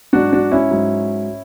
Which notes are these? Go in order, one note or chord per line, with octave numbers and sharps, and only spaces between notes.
G#2 F#3 D4 F#4
D4 F#4
C#4 E4
G#2 F#3